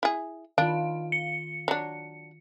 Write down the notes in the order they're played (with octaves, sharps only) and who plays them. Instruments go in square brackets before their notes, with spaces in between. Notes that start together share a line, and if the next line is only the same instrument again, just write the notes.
[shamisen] E4 G#4
[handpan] D#3 F4 [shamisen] D4 [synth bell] F5
[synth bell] C#7
[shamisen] F#3 D4